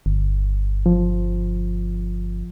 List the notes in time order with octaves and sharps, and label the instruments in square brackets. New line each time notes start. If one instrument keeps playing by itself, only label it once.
[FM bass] G1
[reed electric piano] F3